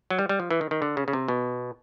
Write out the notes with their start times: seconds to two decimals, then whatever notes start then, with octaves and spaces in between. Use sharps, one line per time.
0.10 F#3
0.19 G3
0.29 G3
0.40 F3
0.51 E3
0.61 D#3
0.71 D#3
0.82 D3
0.97 C#3
1.08 C#3
1.13 C3
1.28 B2